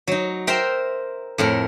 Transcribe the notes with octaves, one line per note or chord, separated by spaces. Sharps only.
F#3 D#4
A#4 C5 E5 G5 A#5 C6
F2 A2 A#4